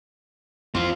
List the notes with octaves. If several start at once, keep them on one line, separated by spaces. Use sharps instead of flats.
F2 E3 C4 F4